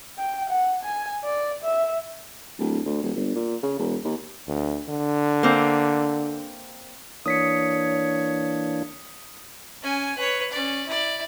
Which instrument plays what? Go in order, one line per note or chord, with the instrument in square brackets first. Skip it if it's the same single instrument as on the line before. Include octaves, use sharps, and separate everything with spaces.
[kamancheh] G5
F#5
G#5
D5
E5
[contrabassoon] D1
D2
D#1
G1
A#2
C#3
E1
D#2
[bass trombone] D2
D3
[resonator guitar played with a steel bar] A#3 C4
[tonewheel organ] E3 A#3 D4 [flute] C#5 [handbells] D#6 B6 C#7
[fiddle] C#4 G#5
B4 C#5
C#4 D5
E4 D5